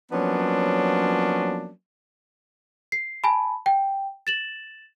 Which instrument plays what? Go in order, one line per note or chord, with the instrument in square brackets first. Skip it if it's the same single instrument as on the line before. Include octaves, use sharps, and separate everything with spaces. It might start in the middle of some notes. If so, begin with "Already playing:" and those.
[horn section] F3 F#3 A#3 B3 C#4 D4
[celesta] C7
G#5 A5 B5
G5
A6 E7 F#7